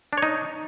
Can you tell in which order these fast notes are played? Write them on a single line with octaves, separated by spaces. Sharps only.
D4 C#5 D#4